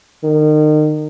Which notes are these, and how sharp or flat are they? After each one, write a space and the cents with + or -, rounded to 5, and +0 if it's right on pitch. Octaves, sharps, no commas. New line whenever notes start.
D#3 -30